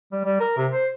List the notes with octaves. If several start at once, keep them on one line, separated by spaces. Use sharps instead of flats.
G3
G3
A#4
C3
C5